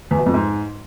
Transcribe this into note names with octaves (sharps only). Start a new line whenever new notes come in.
E2
B2
F2
G#2